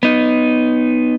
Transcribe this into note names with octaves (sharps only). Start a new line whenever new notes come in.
B3 D#4